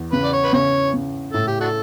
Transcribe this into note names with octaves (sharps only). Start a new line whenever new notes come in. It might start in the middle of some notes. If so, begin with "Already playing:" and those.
Already playing: E2
C#3 B4
D5
C#5
B4
C#3 C#5
C#3
A2 A4
G4
D4 F#4 A4